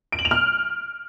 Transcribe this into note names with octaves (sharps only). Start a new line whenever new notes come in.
D7
F#7
F7
F6